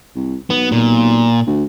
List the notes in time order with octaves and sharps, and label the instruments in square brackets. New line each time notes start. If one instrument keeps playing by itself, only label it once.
[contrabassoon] C2
[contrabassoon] B1 [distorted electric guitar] B3
[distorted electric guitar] A#2
[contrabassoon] D2